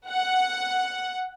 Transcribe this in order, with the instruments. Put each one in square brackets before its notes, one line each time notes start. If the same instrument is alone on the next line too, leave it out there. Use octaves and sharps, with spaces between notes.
[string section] F#5